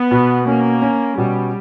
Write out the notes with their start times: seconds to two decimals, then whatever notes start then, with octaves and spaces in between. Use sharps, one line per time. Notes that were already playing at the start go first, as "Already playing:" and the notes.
Already playing: B3
0.11 B2
0.47 A#3 C#4
0.82 C#4
1.17 B2 G3